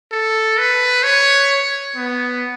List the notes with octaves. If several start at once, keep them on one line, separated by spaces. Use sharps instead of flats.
A4
B4
C#5
B3